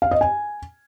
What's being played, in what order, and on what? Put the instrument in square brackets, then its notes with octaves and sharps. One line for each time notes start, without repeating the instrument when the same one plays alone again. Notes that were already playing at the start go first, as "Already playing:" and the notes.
[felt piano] F5
D#5
G#5